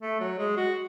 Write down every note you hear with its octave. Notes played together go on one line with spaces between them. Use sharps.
A3
F#3
G#3
F#4